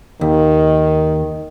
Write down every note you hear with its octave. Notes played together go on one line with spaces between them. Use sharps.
D#2 D#3